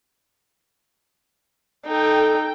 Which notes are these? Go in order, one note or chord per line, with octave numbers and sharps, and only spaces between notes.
D#4 A4 G5